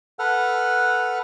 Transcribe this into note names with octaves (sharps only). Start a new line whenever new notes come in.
A4 B4 F#5 F6